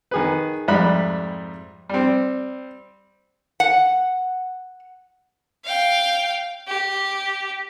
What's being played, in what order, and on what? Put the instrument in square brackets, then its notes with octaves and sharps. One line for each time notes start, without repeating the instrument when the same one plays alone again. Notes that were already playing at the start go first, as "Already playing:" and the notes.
[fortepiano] D#3 G#4 B4
F2 G#2 G3 E5 B5 F#6
G3 C4
[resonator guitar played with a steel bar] F#5
[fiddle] F5 G5
G4